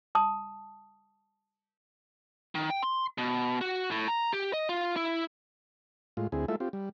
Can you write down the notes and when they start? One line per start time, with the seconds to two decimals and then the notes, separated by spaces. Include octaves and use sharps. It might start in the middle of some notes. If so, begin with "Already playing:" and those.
0.15 A5 D#6
2.55 D#3
2.70 G5
2.83 C6
3.18 B2
3.61 F#4
3.91 A2
4.08 A#5
4.33 G4
4.53 D#5
4.69 F4
4.96 E4
6.17 A2 G#3 F4
6.32 D2 C4 E4 G#4
6.48 G#3 A3 E4 F4 A4 E5
6.60 C4 F4 G4
6.73 G3